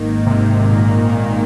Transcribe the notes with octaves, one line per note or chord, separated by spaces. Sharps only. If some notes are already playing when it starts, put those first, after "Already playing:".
Already playing: G#1 G#2 D#3 A#3
C3
A#2